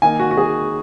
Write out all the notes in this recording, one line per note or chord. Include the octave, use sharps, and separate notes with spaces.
D#3 A#3 D#4 G#5
F#4
F#4
G#4